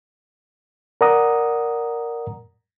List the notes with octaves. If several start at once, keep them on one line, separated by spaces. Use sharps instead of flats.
A#4 D5 F#5 A#5 D#6